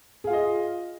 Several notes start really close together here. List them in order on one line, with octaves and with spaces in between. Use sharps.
G#4 F5 F4 D#5